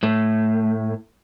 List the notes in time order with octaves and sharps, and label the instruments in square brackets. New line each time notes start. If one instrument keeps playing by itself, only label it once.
[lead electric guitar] A2 A3